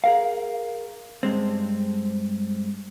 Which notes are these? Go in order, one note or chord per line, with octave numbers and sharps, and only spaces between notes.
G#4 A#4 F5
G2 G#3 C4